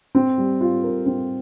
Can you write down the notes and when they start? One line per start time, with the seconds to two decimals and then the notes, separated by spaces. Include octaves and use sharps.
0.15 C4
0.38 G3
0.61 F4
0.84 A#4
1.06 C4